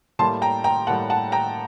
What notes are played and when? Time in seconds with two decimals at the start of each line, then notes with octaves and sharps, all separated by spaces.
0.19 A2 G3 A#3 A5 C6
0.42 G5 A#5
0.64 G5 A#5
0.87 A2 G3 A#3 F#5 A5
1.10 F#5 A5
1.32 G5 A#5